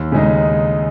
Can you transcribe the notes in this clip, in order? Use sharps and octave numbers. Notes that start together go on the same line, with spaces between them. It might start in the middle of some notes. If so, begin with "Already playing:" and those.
Already playing: D#2
C#3 G#3 D#4